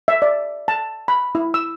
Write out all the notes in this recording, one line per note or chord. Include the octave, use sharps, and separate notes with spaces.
E5
D5
A5
B5
E4
E6